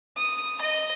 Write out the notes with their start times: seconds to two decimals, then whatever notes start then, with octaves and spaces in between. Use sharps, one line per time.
0.17 D#6
0.61 D#5